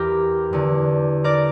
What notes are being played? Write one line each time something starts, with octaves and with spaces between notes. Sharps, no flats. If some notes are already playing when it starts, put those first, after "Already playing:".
Already playing: E2 E3 G4 A#4
E2 D3
A#4 D5